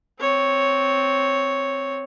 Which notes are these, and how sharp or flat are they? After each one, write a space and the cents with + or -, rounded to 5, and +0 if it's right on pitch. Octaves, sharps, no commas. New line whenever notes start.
C4 +0 C#5 +0